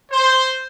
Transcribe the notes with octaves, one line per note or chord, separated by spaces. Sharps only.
C5